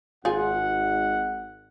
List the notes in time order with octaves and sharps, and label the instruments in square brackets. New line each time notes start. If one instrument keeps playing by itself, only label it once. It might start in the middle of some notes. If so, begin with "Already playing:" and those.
[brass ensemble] G#1 F#5 [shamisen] F4 G#4